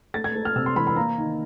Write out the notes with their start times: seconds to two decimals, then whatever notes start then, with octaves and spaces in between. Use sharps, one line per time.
0.14 A3 A6
0.24 G#6
0.35 A3
0.45 F6
0.56 C3 E6
0.66 C6
0.76 E3 B5
0.87 B5
0.96 A#3 A#5
1.18 D#3